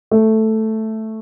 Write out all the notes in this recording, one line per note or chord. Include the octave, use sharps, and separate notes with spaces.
A3